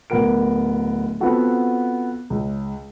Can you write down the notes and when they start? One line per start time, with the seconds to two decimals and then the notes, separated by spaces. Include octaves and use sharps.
0.10 D1 B3 A#4 D7
1.20 B3 C4 F4 F#4 A4
2.30 C#2